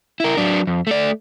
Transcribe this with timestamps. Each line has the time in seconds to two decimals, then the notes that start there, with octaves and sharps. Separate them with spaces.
0.20 E4 A#4
0.37 F#3 D4
0.67 F2
0.87 A3 D5